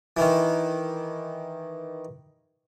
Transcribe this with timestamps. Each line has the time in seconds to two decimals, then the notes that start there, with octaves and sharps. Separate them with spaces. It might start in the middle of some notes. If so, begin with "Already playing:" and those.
0.17 D#3 E3